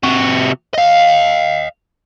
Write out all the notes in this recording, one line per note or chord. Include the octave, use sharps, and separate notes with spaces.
C3 F#4
D#5 F5